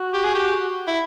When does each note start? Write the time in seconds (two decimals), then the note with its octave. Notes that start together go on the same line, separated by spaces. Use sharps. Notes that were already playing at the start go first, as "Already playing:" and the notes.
Already playing: F#4
0.13 G4
0.24 G#4
0.35 G4
0.87 E4